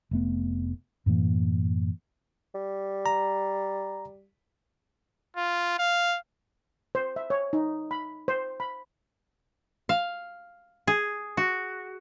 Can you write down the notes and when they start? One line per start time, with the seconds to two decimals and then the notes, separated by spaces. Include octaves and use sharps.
0.11 F1 A3 B3
1.06 F#2 A2 E3 A#3
2.55 G3
3.06 A#5
5.36 F4
5.79 F5
6.95 C5
7.16 E5
7.30 C#5
7.53 D#4
7.91 B5
8.28 C5
8.60 B5
9.89 F5
10.88 G#4
11.37 F#4